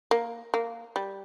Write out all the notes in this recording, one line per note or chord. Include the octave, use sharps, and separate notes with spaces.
A#3
A#3
G3